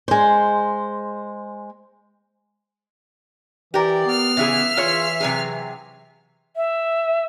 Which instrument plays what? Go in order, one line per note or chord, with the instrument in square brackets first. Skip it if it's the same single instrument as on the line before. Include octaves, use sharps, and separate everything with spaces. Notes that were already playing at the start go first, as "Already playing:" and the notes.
[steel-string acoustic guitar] G#3 C5
[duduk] E3 [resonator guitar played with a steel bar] G4 A#4 [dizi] D5
[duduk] B3 [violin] F6 C7
[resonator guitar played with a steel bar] C#3 E3 G#4 [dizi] E5
[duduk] E3 [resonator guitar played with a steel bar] F4 G#4 C#5
[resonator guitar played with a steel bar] C3 F#3 G#4
[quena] E5